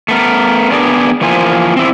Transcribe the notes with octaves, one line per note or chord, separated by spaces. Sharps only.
A3 B3 A#4
B3 D4 G#4 A#4 D5
E3 F3 A#3 C5 G#5
C4 E4